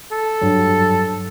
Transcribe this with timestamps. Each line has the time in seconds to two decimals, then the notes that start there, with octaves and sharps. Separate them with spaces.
0.11 A4
0.42 G2 F#3